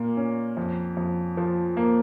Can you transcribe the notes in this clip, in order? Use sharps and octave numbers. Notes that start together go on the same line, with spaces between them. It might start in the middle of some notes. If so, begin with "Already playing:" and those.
Already playing: A#2 A#3
C#4
F2
F2
F3
A#3